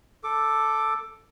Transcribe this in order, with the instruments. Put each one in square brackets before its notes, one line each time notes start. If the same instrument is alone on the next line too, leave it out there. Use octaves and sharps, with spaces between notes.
[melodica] A4 D6